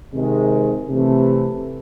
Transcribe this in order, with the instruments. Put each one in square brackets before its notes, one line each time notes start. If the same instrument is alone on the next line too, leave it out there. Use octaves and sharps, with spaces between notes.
[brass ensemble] C3 D#3 G#3
C3 E3 A3